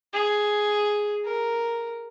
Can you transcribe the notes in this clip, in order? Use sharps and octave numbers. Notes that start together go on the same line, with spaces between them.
G#4
A#4